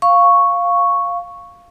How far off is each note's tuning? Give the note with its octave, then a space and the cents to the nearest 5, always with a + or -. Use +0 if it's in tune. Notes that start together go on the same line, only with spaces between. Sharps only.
F5 +0 C#6 +0